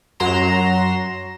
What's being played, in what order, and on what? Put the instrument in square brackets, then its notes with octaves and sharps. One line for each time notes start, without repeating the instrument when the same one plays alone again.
[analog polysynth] F#2 F#3 A#5 C6 E7